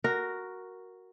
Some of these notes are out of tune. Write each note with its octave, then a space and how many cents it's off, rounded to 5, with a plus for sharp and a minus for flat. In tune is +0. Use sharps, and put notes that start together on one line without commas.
F#4 +0 A#4 +0